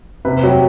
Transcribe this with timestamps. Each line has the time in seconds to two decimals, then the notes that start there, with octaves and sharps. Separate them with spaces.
0.25 C3 B4
0.43 F#3 G4